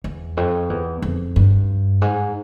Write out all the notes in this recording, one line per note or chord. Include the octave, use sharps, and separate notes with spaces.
E2
F2
E2
F2
G2
G#2